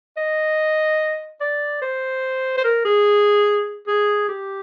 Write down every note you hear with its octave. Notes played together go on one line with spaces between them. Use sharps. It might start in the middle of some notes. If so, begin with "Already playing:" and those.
D#5
D5
C5
C5
A#4
G#4
G#4
G4